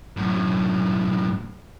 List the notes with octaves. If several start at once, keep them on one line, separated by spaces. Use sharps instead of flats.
F#2 A2